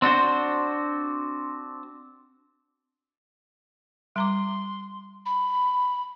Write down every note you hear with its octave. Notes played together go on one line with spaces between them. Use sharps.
C4 D4 F#4 C5
G3 A#5 C6 D6
B5